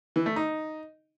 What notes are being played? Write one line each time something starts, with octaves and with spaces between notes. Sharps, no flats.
E3
A3
D#4